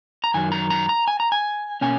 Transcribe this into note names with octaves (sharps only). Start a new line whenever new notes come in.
A#5
F#2 D#3 F#3 G#5
A#5
A#5
A#5
G#5
A#5
G#5
B2 A#3 C#4 G#5